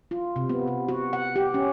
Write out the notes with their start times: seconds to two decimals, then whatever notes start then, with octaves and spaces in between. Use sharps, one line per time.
0.11 F4
0.36 C3
0.49 B3
0.68 C3
0.88 F#4
1.13 F#5
1.36 G4
1.54 C#4